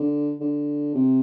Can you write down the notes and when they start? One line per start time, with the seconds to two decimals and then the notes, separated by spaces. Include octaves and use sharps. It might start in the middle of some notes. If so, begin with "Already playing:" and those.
Already playing: D3
0.41 D3
0.95 C3